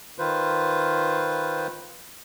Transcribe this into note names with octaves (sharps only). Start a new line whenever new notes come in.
D#3 F4 B4 C5